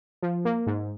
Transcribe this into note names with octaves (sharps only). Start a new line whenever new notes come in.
F3
A#3
G#2